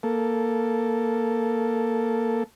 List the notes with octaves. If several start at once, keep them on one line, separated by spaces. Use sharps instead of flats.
A#3 A4